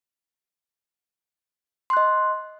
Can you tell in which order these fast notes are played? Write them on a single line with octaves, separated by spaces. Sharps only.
C6 F#6 D#5